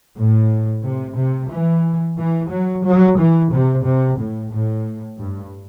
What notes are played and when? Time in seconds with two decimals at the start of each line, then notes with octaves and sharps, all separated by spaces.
0.17 A2
0.83 C3
1.17 C3
1.50 E3
2.17 E3
2.50 F#3
2.84 F#3
3.18 E3
3.51 C3
3.84 C3
4.18 A2
4.51 A2
5.18 G2